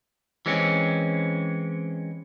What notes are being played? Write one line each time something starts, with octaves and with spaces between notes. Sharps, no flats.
E3 G#3 C4 C#4